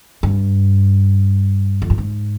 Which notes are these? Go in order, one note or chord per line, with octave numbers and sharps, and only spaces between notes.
G2
F2
G2
G#2